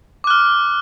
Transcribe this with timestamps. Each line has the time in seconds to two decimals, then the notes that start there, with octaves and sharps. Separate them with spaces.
0.24 D6
0.27 F#6
0.30 F6